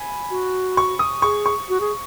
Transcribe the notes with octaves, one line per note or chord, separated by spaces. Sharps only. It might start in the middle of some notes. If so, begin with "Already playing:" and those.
Already playing: G#5 B5
F#4
C#6
D#6
G#4 C#6
C#6
F#4
G#4